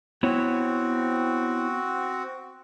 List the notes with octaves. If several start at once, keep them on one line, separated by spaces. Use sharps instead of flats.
B3 C4 E4 F#4 C#5